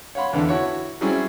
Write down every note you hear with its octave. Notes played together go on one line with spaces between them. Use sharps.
C#5 F5 F#5 B5 C6
E2 D3 D4 A4
E4 F#4 C#5
F#3 G3 C4 C#4 E4 G#4